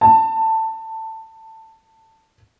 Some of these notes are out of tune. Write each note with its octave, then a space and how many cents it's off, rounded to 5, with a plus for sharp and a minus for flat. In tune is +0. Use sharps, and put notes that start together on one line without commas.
A5 +20